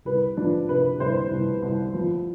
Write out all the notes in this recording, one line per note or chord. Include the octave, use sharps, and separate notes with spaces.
C2 B4
F3 D4
C3 B4
C2 C5
C2
C2
F3